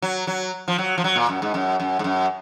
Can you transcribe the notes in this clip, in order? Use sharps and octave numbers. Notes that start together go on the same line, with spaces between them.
F#3
F#3
F3
F#3
F3
F#3
A#2
F#2
G#2
F#2
F#2
G#2
F#2